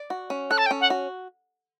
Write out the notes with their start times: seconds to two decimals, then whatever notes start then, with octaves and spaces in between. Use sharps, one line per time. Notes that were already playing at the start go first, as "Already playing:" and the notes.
Already playing: D5
0.10 F#4
0.30 C#4
0.50 A4 F#6
0.58 A5
0.66 G5
0.71 C#4
0.80 F#5
0.90 F#4